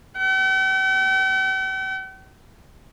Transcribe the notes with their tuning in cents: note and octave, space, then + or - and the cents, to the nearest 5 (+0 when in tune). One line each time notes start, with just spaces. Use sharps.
G5 -45